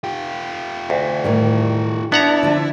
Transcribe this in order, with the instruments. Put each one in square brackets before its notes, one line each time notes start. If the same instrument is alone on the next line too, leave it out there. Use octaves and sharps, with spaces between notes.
[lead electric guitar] F4 G4
[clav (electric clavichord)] D2
[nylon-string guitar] A2 D#3 G3
[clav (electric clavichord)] B3 F#5 A#5 [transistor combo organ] D4 A5 [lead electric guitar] E4
[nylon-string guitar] D3 F3